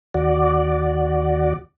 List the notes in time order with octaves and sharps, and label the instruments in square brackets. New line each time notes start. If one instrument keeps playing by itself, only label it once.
[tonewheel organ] D#2 F#4 D5